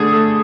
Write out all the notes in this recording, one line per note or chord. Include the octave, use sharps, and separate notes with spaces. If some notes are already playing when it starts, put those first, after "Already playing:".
Already playing: D3 A3 G#4
A3